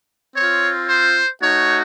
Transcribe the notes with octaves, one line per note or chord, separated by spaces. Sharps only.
C4 F4 C#5
C5
A3 D#4 F#4 C#5